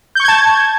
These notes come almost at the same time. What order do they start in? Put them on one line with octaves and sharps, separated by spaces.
G6 C#6 G#6 A5